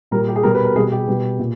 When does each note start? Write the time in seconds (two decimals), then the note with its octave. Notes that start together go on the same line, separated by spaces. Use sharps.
0.11 A#2 G3 A#4
0.28 G4
0.36 G#4
0.43 B2 G3 A#4
0.55 B4
0.65 A#4
0.76 B2 G3 G#4
0.92 G4
1.07 B2 G3
1.39 A#2